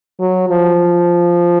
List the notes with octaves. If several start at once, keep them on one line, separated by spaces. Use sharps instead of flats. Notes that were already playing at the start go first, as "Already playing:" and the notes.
F#3
F3